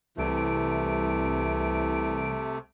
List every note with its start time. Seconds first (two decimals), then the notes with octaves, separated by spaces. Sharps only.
0.17 C2 C3 E3 A3 D7